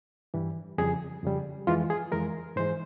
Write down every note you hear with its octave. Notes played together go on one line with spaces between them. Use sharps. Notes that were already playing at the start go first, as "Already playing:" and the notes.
G2 E3 G3
F2 C#3 G3 G#4
F2 C#3 G3
F2 E3 G#3 F4
G#4
F2 E3 G#3 A#4
G#2 E3 G#3 C5